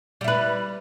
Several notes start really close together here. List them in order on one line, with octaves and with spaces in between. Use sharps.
G3 E4 B4